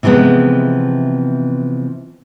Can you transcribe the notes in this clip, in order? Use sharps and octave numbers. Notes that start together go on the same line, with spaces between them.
C3 E3 F3 G#3 B3